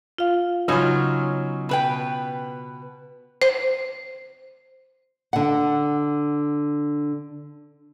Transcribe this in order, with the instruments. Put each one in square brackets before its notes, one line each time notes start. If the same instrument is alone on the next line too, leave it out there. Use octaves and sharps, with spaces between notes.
[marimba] F4 F5
[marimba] C#3 [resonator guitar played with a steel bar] F#3 D#4 [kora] B3 C#4 F4
[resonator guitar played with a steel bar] B2 B4 G5
[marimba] C5
[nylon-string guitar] D3 F#5